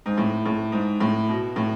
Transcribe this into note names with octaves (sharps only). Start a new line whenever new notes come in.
G#2
A2
A2
G#2
A2
B2
A2